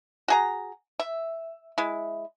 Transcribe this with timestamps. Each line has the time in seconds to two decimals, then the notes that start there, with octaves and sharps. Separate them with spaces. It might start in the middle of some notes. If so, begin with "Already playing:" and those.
0.28 F#4 G#4 A#5
0.99 E5
1.78 G#3 E4